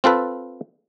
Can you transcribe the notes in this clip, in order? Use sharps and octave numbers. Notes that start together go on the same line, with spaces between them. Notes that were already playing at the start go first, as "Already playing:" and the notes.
C4 F4 A4 B4